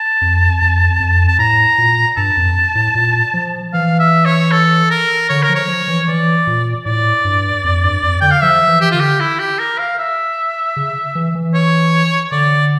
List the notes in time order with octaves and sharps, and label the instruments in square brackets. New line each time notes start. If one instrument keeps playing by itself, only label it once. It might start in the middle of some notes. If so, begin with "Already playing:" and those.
Already playing: [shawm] A5
[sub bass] F2
F2
F2
[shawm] A5
[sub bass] A2 [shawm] A#5
[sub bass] A#2
[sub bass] G2 [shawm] A5
[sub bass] F2
A2
A#2
F3
[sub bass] E3 [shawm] F5
[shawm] E5
C#5
A4
A#4
[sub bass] D3 [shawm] C#5
[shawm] A#4
[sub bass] F3
[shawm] C#5
[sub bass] F3
E3
[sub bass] E3 [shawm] D5
[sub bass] A#2
[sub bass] A2 [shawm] D5
[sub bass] G2
F2
G2
F2
[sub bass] D3 [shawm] G5
[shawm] F5
[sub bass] F3 [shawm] E5
[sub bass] E3
[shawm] G4
[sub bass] D3 [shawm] F4
[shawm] G4
E4
G4
A#4
F5
E5
[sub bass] C#3
E3
E3
[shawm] C#5
[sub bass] D3 [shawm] D5